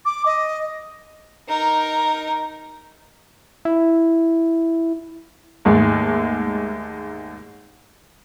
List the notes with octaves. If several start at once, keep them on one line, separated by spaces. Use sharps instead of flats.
D6
D#5
D#4 A#4
E4
D#2 G#2 G#3 A3